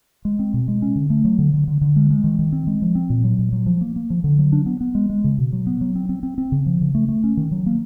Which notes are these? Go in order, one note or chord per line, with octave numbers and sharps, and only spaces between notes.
G#3
C4
B2
G#3
C#4
D3
A3
F#3
D3
D3
D3
D3
G#3
G#3
D#3
D#3
C4
G#3
F3
C4
A#2
F#3
A#2
F#3
F3
A#3
A#3
F3
D3
F#3
D4
B3
B3
G#3
G#3
C#3
B2
F#3
B3
F#3
C4
C4
C4
C4
C#3
F3
C#3
A3
A3
C#4
D#3
F#3
A#3